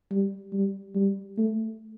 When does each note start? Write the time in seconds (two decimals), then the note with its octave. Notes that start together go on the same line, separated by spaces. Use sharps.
0.11 G3
0.53 G3
0.95 G3
1.38 A3